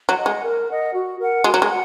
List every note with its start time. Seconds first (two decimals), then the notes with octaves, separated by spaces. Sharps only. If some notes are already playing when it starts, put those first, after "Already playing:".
0.09 F#3
0.17 D#5 F#5
0.26 G#3
0.42 A#4
0.68 D#5 F#5
0.93 F#4
1.19 A#4 F#5
1.44 G#3 F#4
1.54 F#3
1.62 G#3
1.69 F#5